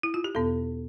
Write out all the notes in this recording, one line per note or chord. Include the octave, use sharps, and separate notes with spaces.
E4
F4
G4
E2 B2 B3 A4